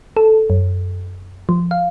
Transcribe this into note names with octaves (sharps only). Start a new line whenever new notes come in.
A4
F#2
F3
F5